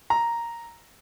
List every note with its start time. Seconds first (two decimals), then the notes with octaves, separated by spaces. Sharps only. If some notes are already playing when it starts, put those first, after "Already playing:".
0.10 A#5